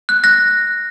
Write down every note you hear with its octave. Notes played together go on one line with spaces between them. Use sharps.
F#6
F#6 A#6